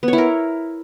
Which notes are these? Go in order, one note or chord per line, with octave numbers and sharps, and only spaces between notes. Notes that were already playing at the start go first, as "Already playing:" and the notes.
B3
C#5
E4
A#4